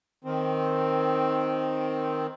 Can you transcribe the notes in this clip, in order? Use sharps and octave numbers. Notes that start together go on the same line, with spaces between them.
D#3 C4